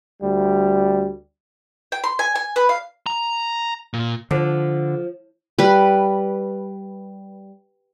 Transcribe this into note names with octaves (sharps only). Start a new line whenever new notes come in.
D2 G3
G5
C6
G#5
G#5
B4
F5
A#5
A#2
D3 F3
G3 B4